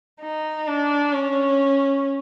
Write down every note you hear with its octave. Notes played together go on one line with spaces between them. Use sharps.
D#4
D4
C#4